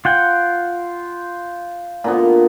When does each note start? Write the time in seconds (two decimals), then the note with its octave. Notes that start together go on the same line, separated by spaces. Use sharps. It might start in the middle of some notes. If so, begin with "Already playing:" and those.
0.05 F4 F#5 G5
2.04 A#2 D3 B3